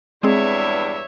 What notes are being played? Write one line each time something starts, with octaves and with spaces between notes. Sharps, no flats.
E2 G2 G#3 C4 G#4 C#5 D5 E5